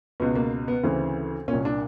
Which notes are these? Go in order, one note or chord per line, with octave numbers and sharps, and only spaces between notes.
C#2 B2 B3
A#3
B3
D2 C#3 E3 C4
A#2 C#4
C2
D4